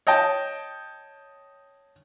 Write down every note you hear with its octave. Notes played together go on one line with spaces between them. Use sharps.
C#5 D#5 G5 A5